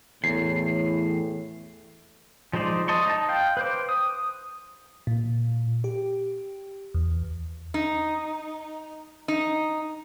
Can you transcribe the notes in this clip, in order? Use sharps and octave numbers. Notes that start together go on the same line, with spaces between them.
E2 A2 C7
F3 G#3 D#4 C5 D5
D#5 A5 C6 C#6
D#4 D#5 A5
F5 G5
B4 C5 D6
D#6
A#2
G4
E2
D#4
D#4